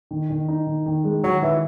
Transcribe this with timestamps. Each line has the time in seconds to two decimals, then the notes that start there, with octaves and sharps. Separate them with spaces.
0.11 D#3
0.30 D#3
0.48 D#4
0.67 D#3
0.86 D#3
1.04 G#3
1.24 D#3 F#3
1.42 D#3 E3